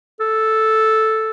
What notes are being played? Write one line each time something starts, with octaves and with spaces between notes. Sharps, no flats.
A4